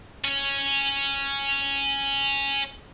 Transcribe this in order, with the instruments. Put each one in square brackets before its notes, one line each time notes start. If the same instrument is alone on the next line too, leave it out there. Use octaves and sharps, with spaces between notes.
[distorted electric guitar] C#4 C#5